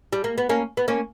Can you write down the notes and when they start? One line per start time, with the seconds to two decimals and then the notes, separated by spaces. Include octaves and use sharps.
0.13 G3
0.24 A#3
0.38 B3
0.49 A#3 C#4
0.77 B3
0.88 A#3 C#4